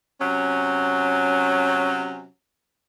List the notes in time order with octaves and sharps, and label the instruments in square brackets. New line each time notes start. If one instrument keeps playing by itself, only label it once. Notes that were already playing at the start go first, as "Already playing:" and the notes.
[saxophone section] C3 F#3 C#4